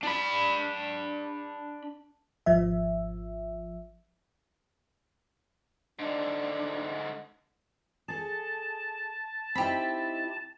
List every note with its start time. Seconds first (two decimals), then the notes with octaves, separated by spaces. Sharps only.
0.03 D4 B5
2.46 G#1 F3 E5
5.99 G#2 D3 D4
8.08 G#4 A4 A5
9.55 C4 D#4 E4 G4 B5